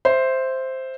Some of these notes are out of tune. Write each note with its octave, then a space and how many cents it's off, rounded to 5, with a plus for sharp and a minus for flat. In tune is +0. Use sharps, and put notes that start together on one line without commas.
C5 +0 E5 +0